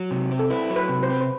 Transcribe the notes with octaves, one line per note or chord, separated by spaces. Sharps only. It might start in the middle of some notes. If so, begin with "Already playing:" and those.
Already playing: F#3
C3
C4
A4
E4 B4
F#3
B4
C3
C5
C4 B4
C5